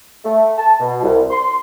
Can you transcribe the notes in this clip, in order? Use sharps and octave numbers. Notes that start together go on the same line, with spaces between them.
A3
A5
B2
C2
C6